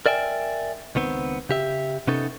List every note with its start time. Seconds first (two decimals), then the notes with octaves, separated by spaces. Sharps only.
0.06 A#4 D5 E5 G5 G#5
0.95 C#2 D#3 B3 C4
1.49 C#3 G4 E5
2.07 C3 B3 C#4 D#4 A4